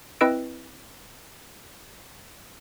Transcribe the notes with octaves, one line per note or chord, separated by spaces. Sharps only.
C4 E4 B4 D#5 E6 D7